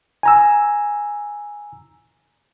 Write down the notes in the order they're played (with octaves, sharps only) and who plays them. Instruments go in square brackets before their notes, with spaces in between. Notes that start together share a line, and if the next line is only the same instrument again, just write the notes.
[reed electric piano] G#5 A#5 E6